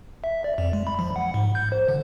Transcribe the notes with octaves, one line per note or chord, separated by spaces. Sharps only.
E5
D5
F2
G#3
B5
F3
F#5
G#2
G6
C5
D3